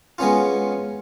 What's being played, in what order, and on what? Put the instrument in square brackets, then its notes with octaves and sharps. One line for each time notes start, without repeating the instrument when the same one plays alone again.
[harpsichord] G#3 B3 C#4 F4